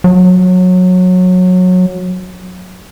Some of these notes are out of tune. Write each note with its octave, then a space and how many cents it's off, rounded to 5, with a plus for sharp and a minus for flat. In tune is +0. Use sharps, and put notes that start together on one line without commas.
F#3 -20